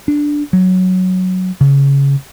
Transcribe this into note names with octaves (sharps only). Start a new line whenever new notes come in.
D4
F#3
C#3